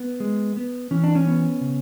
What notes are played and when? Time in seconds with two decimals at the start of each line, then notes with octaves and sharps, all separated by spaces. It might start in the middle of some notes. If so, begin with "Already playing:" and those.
Already playing: B3
0.20 G#3
0.57 B3
0.91 E3 C#4
1.04 D4
1.15 C#4
1.27 B3
1.61 C#3